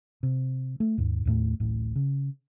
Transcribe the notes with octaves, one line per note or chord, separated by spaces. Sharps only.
C3
A3
D#2 G#2
D#2 A2 A3
D1 A1 A2
C#3